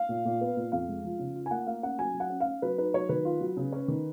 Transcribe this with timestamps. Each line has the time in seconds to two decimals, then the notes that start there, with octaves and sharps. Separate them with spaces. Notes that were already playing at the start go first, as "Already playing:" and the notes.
Already playing: F5
0.09 A#2
0.25 A#2
0.41 B3
0.57 A#2
0.72 F2 F5
0.88 G#3
1.04 F3
1.19 C#3
1.36 F4
1.46 G#5
1.51 A#3 F#5
1.67 A#3 F5
1.83 C#4 F#5
1.99 F#3 G#5
2.14 F#3
2.20 F#5
2.30 C#4
2.40 F5
2.46 C#4
2.62 F#3 B4
2.78 D#4 B4
2.94 F#3 C#5
3.09 D#3 B4
3.25 F4
3.41 F#3
3.57 C#3
3.72 C#4
3.88 D#3